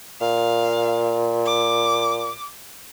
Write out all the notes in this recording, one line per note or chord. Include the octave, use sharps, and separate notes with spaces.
A#2 F5
D6